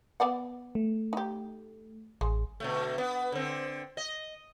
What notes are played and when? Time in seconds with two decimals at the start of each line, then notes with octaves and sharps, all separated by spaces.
0.20 B3 D5 F#5
0.75 A3
1.13 D#4 G4
2.21 A1 G#3
2.60 B2 D3 A3
2.98 B3
3.32 D3 C4
3.97 D#5